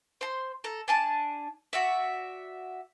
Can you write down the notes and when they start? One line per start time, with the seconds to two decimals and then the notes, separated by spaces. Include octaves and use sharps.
0.21 C5 C6
0.64 A4 A#5
0.88 D4 G#5 A5
1.73 F#4 D5 E5